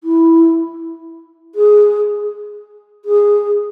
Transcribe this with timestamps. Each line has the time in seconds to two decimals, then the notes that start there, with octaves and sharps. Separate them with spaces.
0.04 E4
1.55 G#4
3.05 G#4